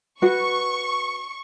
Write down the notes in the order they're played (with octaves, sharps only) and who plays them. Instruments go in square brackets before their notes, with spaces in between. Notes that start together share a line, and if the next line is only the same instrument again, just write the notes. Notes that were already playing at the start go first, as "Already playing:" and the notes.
[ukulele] F#4 B4 [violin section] C#6